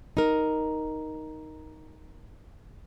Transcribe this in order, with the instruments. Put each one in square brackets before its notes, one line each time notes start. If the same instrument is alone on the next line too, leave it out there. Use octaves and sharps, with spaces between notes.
[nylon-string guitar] D#4 A#4